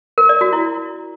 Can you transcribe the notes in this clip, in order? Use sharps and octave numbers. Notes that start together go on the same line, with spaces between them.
A#4
D5
F#4
E4